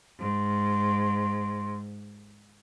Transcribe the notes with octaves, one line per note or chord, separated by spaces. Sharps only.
G#2 C6